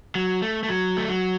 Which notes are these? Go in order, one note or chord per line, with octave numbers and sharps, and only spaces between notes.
F#3
A3
A3
F#3
A3
F#3